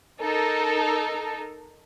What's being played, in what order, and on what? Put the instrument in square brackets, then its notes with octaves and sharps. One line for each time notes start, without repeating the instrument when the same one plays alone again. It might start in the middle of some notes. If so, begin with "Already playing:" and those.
[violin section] D#4 A4 A#4